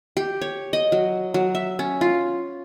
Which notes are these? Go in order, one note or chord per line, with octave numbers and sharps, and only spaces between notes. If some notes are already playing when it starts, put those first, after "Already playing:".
G4
C#5
D#5
F#3
F#3
E5
C#4
F4